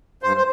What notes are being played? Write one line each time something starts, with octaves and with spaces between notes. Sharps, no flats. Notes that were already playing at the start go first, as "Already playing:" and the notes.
G2 C5
C5